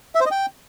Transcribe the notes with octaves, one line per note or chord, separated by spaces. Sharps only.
E5
C5
D#5
G5